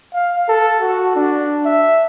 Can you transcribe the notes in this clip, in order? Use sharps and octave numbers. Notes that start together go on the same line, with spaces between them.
F5
A4
F#4
D4
E5